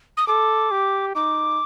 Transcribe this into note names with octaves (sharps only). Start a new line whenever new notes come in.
D#6
A4 D6
G4
D#4 D6